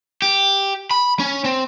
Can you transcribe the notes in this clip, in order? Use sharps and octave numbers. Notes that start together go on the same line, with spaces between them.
G4
B5
C#4
C4